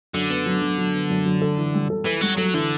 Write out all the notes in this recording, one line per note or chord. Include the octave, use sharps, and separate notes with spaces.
F#2 D3
B3
F#3
F#3
F#3
B3
F#2
F#3
A4
E3
G3
A4
E3 A4
F#3 G3
F#3 A4
D3 E3